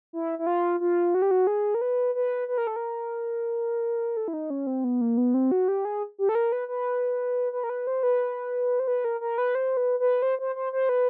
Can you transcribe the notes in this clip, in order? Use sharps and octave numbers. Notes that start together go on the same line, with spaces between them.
E4
E4
F4
F4
F#4
G4
F#4
G#4
A#4
B4
B4
B4
A#4
A4
A#4
A4
E4
D#4
C#4
C4
B3
A#3
B3
C4
F#4
G4
G#4
G4
A4
A#4
B4
B4
B4
A#4
B4
C5
B4
C5
B4
A#4
A#4
B4
C5
B4
B4
C5
C5
C5
C5
B4